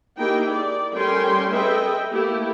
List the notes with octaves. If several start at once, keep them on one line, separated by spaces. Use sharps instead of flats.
A#3 D#4 E4 G4 G#4 G5
D5
G3 A3 C#4 A#4 G5 C6
G#4 A4 B4 D#5 E5 G5
A3 A#3 E4 G4 A4